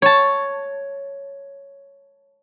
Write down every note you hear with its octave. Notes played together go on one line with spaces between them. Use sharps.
C#5 A5